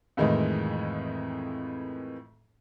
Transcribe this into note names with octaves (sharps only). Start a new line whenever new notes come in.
F2 A2 D#3 E3 G#3